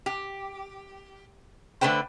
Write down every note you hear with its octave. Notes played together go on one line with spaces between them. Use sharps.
G4
D3 A3 B4 C5 G5